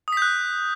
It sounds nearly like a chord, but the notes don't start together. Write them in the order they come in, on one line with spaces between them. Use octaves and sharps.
D#6 B6 G6 F#6